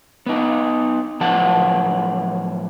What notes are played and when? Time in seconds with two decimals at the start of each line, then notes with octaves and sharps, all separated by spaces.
0.26 B3 D#4
1.21 A2 F3 F#3 B4 F#5 A5